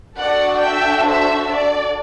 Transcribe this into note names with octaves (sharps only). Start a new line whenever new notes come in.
D4 F#4 A4 D5 F#5
E5 G5
C5 E5
D5